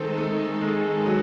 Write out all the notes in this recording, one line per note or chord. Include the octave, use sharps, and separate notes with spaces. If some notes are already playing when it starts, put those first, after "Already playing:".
Already playing: D#3 G#3 A3 C4 D#4 A4
A3
G#3
F#3